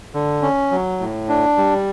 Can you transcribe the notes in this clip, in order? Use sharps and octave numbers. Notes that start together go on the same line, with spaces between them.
D3
C#4
F#3
A2
D4
G3